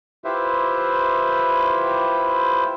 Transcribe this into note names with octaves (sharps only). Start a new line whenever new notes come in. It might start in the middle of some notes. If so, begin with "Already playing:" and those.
E4 F4 G4 B4 C5 E5